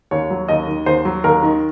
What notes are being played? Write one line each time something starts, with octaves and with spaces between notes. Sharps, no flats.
D#2 C#5
F#3
D#2 D#5
D#3
D#2 C5
F#3
D#2 A#4
D#3